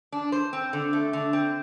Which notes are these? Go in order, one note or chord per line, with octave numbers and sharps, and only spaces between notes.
D4
C5
C4
D3
A3
D3
C4